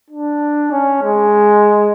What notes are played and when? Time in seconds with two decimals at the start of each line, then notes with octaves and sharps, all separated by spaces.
0.10 D4
0.71 C#4
1.03 G#3